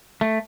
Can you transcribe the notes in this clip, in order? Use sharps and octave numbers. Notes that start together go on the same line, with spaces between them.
A3